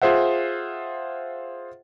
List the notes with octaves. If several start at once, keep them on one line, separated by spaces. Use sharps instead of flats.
F4 G#4 C5 E5 F#5